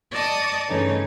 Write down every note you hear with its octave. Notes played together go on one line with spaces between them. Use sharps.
D5 D#5 A5 C#6 D#6
G2 C#3 E3 A3 C#4 D#4